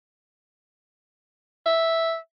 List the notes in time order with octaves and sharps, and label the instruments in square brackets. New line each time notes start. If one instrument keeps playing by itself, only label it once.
[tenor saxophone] E5